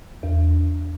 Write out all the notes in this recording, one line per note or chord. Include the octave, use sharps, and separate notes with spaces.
E2